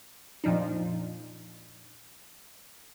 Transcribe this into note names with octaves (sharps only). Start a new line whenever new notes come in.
F2 A#2 F3 D4 D#4